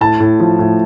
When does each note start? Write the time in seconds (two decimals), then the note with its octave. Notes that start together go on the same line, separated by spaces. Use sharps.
0.01 A2 A5
0.20 A2
0.40 F3
0.59 A2